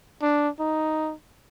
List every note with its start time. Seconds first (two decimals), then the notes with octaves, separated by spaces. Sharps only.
0.22 D4
0.60 D#4